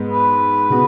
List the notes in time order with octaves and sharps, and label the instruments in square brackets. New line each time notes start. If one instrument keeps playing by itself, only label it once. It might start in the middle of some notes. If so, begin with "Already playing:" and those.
Already playing: [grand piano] G#2 G#3 B3
[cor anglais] B4
[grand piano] C#3 B3 F#4